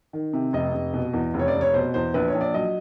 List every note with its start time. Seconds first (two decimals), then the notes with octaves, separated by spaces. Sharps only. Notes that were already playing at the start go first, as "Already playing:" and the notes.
0.13 D#3
0.33 C3
0.53 F1 D#5
0.74 F1
0.94 B2
1.13 E2
1.34 F1
1.39 C#5
1.48 D5
1.55 F1
1.61 C#5
1.74 B2 C5
1.94 E2 C5
2.14 A#1 B4
2.28 C#5
2.34 A#1
2.41 D5
2.54 F#3 D#5